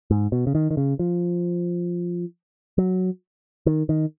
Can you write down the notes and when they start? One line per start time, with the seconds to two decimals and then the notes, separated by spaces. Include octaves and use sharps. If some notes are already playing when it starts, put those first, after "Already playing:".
0.11 G#2
0.32 B2
0.47 C#3
0.55 D#3
0.71 D#3
0.77 C#3
0.99 F3
2.78 F#3
3.66 D#3
3.89 D#3